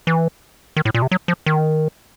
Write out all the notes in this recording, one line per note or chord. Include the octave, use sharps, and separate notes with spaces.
E3
D#3
A2
A#2
C3
F#3
F3
D#3